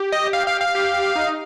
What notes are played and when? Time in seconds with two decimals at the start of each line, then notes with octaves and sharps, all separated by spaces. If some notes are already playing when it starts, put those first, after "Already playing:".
Already playing: G4
0.12 D#5
0.33 F5
0.47 F5
0.61 F5
0.75 G4
1.15 D#4